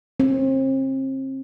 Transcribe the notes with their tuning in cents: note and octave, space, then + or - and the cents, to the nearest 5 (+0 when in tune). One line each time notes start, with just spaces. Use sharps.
C4 +35